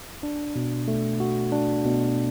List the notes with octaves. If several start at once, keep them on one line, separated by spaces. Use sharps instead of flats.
D4
B2
A3
F#4
D4
B2